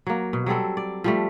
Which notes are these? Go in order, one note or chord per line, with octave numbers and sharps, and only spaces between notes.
F#3 A#3
B2
F#3 G3 C4 A4
D5
F3 G3 A3